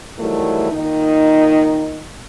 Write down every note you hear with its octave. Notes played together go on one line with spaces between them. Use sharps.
D#3 E3 F#3 G3 A3
A#2 D#3 D#4